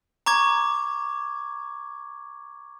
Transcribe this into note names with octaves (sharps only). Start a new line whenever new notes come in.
A#5 C#6 D6 G#6